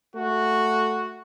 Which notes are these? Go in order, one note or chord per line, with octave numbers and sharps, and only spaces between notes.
A3 F#4